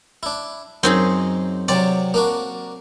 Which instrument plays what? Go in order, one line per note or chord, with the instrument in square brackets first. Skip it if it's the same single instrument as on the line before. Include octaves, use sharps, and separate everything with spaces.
[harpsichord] D4 E4
[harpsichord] F#2 [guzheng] C4 D#4 G#4
[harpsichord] C3 F#3 C4 [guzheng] D5
[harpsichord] A#3 D4 F#4